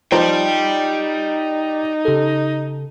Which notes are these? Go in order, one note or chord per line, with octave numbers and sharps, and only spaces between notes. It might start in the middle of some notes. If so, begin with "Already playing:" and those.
F3 D#4 G4 C5 D5 G5 A#5
C#3 G4 A4